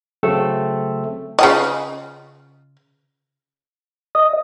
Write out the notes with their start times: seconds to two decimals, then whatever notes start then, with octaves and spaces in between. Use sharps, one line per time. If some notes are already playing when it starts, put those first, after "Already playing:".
0.23 C#3 F#3 A3 C4 A4
1.39 C#3 F4 D#5
4.15 D#5